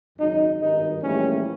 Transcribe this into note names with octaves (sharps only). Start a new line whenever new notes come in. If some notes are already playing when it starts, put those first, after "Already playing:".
G#1 F#2 C#3 F#3 D#4
G#1 G2 D#3 G3 D#4
A#1 A2 E3 G3 A#3 C#4